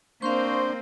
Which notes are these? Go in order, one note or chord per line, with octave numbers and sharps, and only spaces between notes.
A#3 C4 D4 C5 F5 C6 C#6